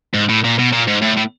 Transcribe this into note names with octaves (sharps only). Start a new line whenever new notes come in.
G#2
A2
A#2
B2
A#2
G#2
A2
A2